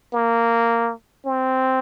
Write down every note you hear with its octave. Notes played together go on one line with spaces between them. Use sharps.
A#3
C4